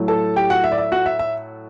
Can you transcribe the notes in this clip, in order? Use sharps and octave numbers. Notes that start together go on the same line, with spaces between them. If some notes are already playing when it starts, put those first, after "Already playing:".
Already playing: A2 F#3 A3
A4 A5
G4 G5
F#4 F#5
E5
D5
E5
F#4 F#5
E5
E5